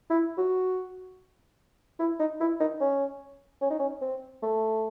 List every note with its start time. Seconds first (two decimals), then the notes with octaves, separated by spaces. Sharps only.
0.10 E4
0.38 F#4
2.00 E4
2.20 D#4
2.40 E4
2.60 D#4
2.80 C#4
3.62 C#4
3.70 D#4
3.79 C#4
4.02 C4
4.43 A3